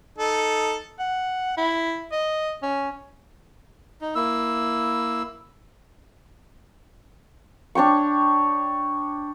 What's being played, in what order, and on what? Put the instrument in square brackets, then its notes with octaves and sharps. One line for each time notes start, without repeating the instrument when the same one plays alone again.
[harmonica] D#4 A4
[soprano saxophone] F#5
E4
D#5
C#4
[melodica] D#4
A#3 E4 E6
[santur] D4 C#5 G5 C#6